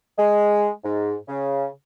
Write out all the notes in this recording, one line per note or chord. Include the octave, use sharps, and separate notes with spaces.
G#3
G#2
C#3